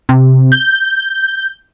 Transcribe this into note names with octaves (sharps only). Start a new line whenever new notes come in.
C3
G6